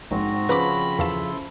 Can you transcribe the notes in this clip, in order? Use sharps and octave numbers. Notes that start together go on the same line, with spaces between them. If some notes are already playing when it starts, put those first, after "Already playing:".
A#1 G#2 C4 F#4 A#5
C#3 F3 B4 B5 D6
E2 E4 A4 F5 A5 C6